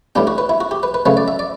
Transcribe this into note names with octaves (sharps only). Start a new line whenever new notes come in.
A2 G3 B3 D4 G4
F#4
B4
E4
F#4
G4
B4
B4
C#3 F#3 A3 C#4 B4
D5
E5
D5